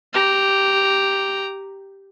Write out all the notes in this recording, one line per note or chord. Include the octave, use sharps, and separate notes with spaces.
G4 A#5